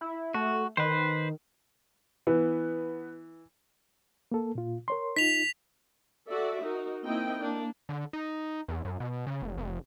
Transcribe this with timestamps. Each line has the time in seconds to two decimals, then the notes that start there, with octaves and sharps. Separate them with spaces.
0.01 E4
0.34 A3 F#4
0.77 D#3 B4 C5
2.27 E3 B3
4.32 A#3 A4
4.55 A#2 F4
4.88 A#4 C#5 C6
5.16 D#4 F4 B6 F7
6.30 F#4 A4 D5 E5
6.62 D#4 F#4 A#4
7.05 A#3 C4 D#4 E4 D#5 G5
7.40 A#3 D4
7.89 D3
8.13 D#4
8.68 E2
8.85 F#2
9.00 B2
9.27 C#3
9.42 F1
9.57 F1